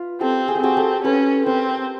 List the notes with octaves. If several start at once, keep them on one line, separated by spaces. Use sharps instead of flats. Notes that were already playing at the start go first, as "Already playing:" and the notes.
Already playing: F4 B4
C4 G4 A4
G#4
G4
C4 F#4 G#4
G4 A4
C#4 A4 B4
C4 A#4 C5